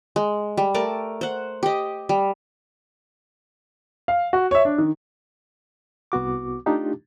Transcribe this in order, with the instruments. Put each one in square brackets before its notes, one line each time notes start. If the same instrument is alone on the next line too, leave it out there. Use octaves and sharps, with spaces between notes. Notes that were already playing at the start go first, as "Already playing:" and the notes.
[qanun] G#3
G3
A3 A#4 D5 A5
C5 F#5
G4 D#5
G3
[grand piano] F5
F#4
C#5 E5
D4
D#3
[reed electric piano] C2 B3 F#4 D6
A3 D4 D#4 F4 G4